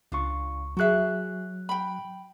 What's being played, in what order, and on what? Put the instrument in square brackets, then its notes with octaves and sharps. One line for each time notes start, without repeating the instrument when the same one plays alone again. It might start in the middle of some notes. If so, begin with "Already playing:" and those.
[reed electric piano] C#2 C#6 [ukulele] D4 F4
[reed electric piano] F#3 F#6 [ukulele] F#4 G#4 E5
[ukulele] G5 B5